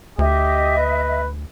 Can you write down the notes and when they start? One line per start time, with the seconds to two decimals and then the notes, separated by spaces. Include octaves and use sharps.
0.19 D2 G4 D#5 E5
0.78 B4